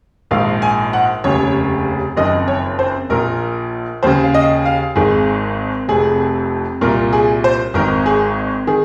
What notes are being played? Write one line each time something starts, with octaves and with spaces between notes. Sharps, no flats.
A#1 G#2 D#3 F5
G#5
F#5
F1 D#2 C#3 C#5
F#1 F2 D#3 D#5
C#5
C5
A#1 A#2 A#4
D#2 C#3 C5
F5
D#5
F5
G#1 G#2 D#3 G#4
F1 F2 C3 G#4
C2 A#2 A#4
G#4
C5
G#1 G#2 D#3 A#4
G#4
D#3 G#4